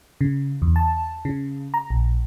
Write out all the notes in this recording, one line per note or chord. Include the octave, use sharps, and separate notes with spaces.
C#3
E2
A5
C#3
A#5
A#1